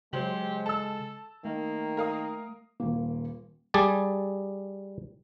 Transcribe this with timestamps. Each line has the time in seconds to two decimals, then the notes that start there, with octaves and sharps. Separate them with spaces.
0.13 C#3 F#3 G#3 G4 C5 F#7
0.66 A4 A5 E6
1.45 D#3 A3 A#3
1.97 A#4 F5 D#6
2.80 D#1 A#3
3.74 G3 G#4 D5 A5